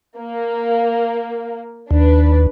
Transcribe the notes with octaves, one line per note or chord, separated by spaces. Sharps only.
A#3
D#2 D4 B4